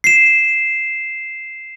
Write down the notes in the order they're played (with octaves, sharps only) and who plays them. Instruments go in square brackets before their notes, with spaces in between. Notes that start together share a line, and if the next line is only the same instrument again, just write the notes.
[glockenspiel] C7 E7